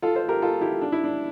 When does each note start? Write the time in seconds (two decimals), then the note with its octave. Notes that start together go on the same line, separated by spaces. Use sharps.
0.02 F4 A4
0.15 A4 C5
0.28 G4 A#4
0.42 F4 A4
0.61 E4 G4
0.82 D4
0.92 E4
1.04 D4